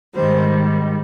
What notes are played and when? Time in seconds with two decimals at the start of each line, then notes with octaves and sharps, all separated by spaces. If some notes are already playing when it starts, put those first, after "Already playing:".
0.14 G#2 D#3 G3 C5